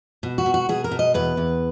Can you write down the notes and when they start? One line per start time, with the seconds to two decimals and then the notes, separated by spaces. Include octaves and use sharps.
0.23 B2
0.38 F#4
0.46 B2
0.54 F#4
0.69 B2 G#4
0.84 A#4
0.92 B2
0.99 D#5
1.14 E2 B4
1.37 E2